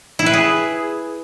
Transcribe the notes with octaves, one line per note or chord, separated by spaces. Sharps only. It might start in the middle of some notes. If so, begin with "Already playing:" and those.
E4
B4
G#4